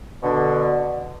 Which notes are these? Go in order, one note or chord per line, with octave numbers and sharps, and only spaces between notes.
B2 D3